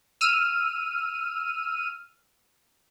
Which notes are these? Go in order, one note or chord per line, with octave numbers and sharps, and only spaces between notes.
E6 F6 D#7